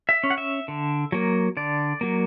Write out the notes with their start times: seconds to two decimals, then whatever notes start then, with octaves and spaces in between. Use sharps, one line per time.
0.09 E5
0.24 C#4
0.30 F#5
0.38 E5
0.68 D3
1.12 F#3 A#3
1.57 D3 D5
2.01 F#3 A#3